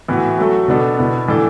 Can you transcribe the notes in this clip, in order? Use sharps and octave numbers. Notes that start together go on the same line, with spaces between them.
A2 E3 B3 F#4
F#3 A3 F#4 A4
B2 B3 D4 A4
B2 B3 E4
A2 E3 D4 A4